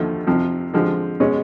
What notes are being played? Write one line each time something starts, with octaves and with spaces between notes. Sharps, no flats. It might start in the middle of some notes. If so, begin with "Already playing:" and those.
Already playing: D#2 D3 F3 A3
F2 C3 F3
D3 F3 G#3 C4
B2 G#3 C#4